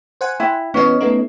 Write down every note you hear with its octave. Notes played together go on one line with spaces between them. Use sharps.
C5 F#5 G#5
E4 G5
E3 B3 C#4 C#5 D#5
A3 B3 D#4